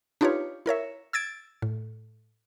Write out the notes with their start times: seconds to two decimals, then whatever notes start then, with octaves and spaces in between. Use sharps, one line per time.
0.21 D4 D#4 F4 G4 B4 C#5
0.66 E4 A#4 C#5 E5
1.13 E6 G#6 A6 D7
1.62 A2